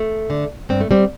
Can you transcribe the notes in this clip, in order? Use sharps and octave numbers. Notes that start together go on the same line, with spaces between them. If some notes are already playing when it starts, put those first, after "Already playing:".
Already playing: A3
D3
G2 C4
A3
G3 C4